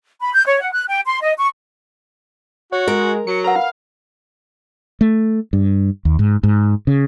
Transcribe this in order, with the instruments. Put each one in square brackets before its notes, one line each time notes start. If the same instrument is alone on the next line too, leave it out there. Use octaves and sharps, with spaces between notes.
[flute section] B5
G6
C#5
F#5
F#6
G5
C6
D#5
C#6
[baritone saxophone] F#4 [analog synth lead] C#5
[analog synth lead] G#3 [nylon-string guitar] A#4
[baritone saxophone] F#3 [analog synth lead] C#7
[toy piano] A#4 B4 F#5 [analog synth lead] A#5
[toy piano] F4 [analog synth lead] F5
[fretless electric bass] A3
G2
D#2
G#2
G#2
C#3